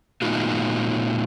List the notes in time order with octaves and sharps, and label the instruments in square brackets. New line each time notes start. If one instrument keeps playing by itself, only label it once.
[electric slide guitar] A#2 A3 B3 D#4 F4 F#4